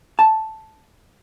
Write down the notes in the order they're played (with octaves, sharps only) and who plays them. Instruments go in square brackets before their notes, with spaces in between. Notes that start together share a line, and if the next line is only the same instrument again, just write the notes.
[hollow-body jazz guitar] A5